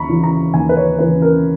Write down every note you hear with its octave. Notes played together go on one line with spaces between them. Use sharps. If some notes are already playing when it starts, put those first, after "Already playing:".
Already playing: D#2 A#5 B5 C#6
C#3 E3
A#5
D#2 G#5
B4
C#5
C#3 E3 B4
A#4